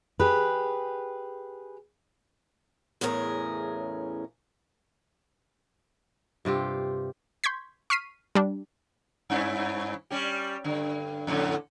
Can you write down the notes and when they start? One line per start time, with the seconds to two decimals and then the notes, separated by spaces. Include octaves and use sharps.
0.20 G4 G#4 B4
3.01 E2 A2 C#3 C#4 G#4 A#4
6.45 G2 C3 F4 G4
7.44 C6 C#6 G6 G#6 B6
7.90 C#6 F6 B6 C7 D#7
8.35 G3 D4
9.30 G2 C#4 E4
10.10 G3 C#4 G4
10.64 G2 D3
11.27 F2 A2 D3